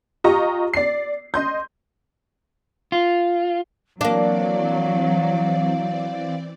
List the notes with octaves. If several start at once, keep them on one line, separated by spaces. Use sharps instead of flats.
F4 G4 D#5 A#5 C#6
D5 C7
D#5 C6 G6
F4
E3 F#3 A#3 C4 D4 D5 F5